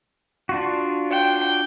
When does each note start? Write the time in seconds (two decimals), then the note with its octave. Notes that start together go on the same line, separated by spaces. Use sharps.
0.49 D4 F4 F#4
1.11 G5